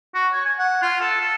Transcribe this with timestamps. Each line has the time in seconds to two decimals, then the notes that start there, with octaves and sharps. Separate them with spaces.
0.15 F#4
0.33 C#5
0.45 G#5
0.59 F#5
0.82 F4
1.01 A4
1.21 A4